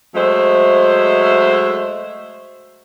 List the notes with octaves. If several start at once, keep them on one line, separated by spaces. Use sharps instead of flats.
F#3 G#3 A3 C5 E5